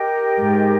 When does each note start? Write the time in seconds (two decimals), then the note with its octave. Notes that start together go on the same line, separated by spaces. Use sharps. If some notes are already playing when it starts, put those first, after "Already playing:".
Already playing: G4 A#4 D#5 G5
0.39 G#2